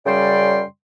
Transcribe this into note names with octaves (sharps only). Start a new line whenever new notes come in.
F#2 C#3 G3 D5 G5 C6